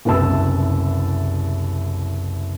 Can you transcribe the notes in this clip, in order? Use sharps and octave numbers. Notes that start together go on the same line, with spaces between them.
F#1 C2 B4 E5 A5 E6